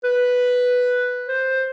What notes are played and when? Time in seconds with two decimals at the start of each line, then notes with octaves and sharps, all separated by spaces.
0.04 B4
1.28 C5